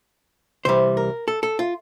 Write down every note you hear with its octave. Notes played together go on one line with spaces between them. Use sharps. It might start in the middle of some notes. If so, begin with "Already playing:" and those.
C2 C3 E3 G3 C5
A#4
A4
A4
F4